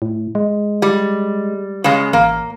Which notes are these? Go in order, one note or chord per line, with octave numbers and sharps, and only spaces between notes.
A2
G#3
G3
C#3 G#3
A1 A#3